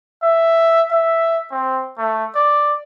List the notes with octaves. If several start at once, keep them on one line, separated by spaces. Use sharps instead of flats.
E5
E5
C4
A3
D5